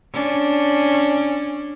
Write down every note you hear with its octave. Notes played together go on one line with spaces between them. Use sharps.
C#4 D4